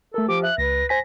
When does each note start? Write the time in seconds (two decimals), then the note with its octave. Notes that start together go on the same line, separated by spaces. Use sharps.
0.14 A3 A4 A#4
0.29 F3 G4 D6
0.43 E5 F#6
0.58 C#2 B4 A#6
0.89 C5 G#5 A#6 B6